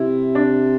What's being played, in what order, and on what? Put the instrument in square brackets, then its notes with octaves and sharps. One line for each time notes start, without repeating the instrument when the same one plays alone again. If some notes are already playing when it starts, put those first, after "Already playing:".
Already playing: [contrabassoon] C3 [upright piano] E4
[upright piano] D4